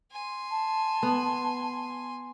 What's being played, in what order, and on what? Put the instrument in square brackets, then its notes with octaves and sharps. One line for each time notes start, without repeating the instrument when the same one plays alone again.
[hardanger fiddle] G#5 C6
[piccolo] A5
[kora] B3